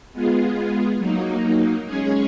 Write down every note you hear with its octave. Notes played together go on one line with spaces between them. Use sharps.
G#3 B3 F4 G#4
F#3 A#3 D#4
G#3 C#4 G#4 C#5